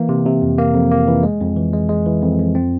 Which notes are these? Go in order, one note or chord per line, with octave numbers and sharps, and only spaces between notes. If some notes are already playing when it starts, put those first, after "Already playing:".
Already playing: E3 A#3
C3
C3
F2
A#3
F2
A#3
E3
G#3
F2
E3
G#3
G#3
E3
F2
F2
C4